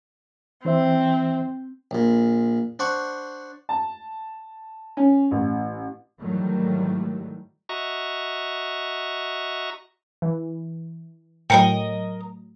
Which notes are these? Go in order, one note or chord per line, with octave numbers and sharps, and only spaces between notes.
E3 C4 C5 E5
A#1 A#2
D4 C5 F#5 C#6
A5
C#4
A1
G#2 D#3 E3 F#3 G3 A3
F#4 D#5 E5 A#5 C#6
E3
A2 F#3 A#4 B4 D#5 G5 C#7